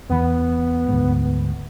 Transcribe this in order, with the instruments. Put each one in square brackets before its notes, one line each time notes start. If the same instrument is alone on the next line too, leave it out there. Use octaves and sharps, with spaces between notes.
[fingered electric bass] E2 E3 [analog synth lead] B3
[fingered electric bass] D2 G#2